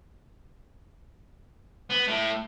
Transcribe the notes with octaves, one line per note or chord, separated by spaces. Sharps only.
B3
A2